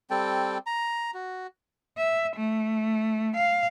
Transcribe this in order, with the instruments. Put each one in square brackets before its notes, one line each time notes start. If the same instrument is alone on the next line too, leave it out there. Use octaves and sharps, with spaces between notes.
[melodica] G3 C4 A4 G5
A#5
F#4
[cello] E5
A3
F5